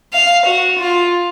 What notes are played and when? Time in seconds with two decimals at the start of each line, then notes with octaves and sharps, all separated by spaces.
0.14 F5
0.46 F#4
0.79 F4